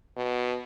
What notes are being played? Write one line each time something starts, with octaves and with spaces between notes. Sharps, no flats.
B2